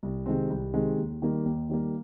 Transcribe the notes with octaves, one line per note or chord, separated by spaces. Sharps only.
C2
C3 D#3 G#3 C4
C2
C3 D#3 G#3 C4
D#2
D#3 G3 A#3
D#2
D#3 G3 A#3